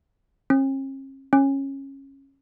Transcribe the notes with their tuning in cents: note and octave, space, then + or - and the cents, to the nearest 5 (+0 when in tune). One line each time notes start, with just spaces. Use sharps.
C#4 -45
C#4 -20